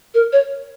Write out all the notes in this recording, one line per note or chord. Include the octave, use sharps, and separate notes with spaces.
A#4
C#5